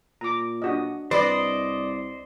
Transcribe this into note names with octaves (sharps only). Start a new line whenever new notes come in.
A#2 A#5 D6
D4 F#4 D#5
C2 B4 C5 D5 D#5